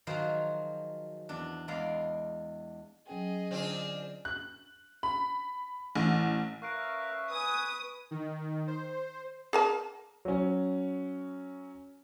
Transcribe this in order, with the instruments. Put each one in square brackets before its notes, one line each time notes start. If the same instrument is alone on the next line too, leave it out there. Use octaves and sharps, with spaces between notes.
[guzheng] D#3 F3 F#3 F#4 G#4 C5
E2 D4
E2 G#3 G#4 D5 F5 B5
[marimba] F#3 C#4 G5 [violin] G#4 D#5
[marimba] D3 [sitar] C4 D4 F4
[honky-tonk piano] F#6
B5
A1
[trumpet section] C#4 B4 E5 [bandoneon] A#4 F5 [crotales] C#6 F#6 D7
[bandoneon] B4 [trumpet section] G#5 [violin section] D#6
[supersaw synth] D#3
C5
[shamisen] G#4 A#4 A5
[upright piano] F#3 C#4